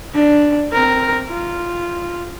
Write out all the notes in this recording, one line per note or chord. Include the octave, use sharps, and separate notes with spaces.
D4
C4 A#4
F4